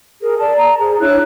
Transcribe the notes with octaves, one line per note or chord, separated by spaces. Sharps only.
G#4 A#4
D5 A5
A#5
G#4 C5
D4 E4 C#5 F#6